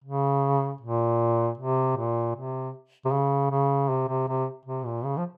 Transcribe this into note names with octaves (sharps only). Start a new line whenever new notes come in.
C#3
A#2
C3
A#2
C3
C3
C#3
C#3
C3
C3
C3
C3
A#2
C#3
F3